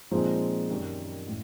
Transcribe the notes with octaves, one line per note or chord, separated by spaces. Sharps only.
A#2 F3 G#3 C4 D#4
F#2 D#3 G3
A2